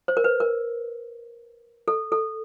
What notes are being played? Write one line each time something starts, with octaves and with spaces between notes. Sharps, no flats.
C5
A#4
B4
A#4
A4
A4